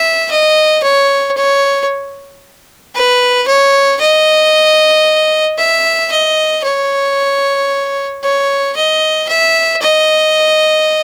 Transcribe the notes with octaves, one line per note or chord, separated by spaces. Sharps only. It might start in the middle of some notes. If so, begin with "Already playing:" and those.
Already playing: E5
D#5
C#5
C#5
B4
C#5
D#5
E5
D#5
C#5
C#5
D#5
E5
D#5